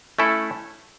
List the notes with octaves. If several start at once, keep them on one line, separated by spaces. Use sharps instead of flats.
A3 C#4 E4 A4